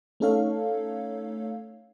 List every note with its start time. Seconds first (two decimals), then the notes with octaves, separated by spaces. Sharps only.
0.20 A3 C#4 D#4 A4 C#5 F5